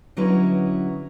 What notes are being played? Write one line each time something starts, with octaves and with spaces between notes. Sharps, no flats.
D3 F#3 C#4 E4 B4 D#5